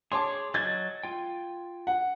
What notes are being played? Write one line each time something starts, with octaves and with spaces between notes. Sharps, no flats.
G#4 C#5 A5 C6 D6
F#3 D#5 G#6 A6
F4 G5
F#5